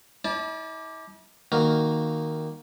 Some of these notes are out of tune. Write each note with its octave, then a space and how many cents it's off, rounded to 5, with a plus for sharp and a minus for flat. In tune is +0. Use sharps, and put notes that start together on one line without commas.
E4 -45 D5 +0 A5 -30
D#3 +0 A#3 +0 F#4 +0